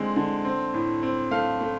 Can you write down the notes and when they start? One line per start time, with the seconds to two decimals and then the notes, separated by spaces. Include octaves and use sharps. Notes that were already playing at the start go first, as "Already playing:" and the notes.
Already playing: D3 G#3 C4
0.16 D3
0.45 C4
0.74 A2
1.03 C4
1.31 A3 F5
1.61 A3